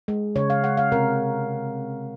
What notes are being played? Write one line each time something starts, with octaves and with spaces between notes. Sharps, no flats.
G#3
C#3 C#5
F5
G#3 F#5
F5
C3 A#4